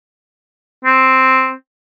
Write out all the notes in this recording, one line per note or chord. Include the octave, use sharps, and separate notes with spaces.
C4